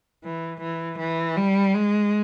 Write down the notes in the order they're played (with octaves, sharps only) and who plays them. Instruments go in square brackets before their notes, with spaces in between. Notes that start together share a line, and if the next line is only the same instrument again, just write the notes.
[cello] E3
E3
E3
G3
G#3